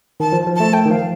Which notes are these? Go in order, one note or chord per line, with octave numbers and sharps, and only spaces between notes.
D#3 A5
F3
F3
A3 A5
A3 G5
D#3
F3 F5